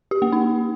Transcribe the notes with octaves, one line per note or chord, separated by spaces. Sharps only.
G4
A#3
D#4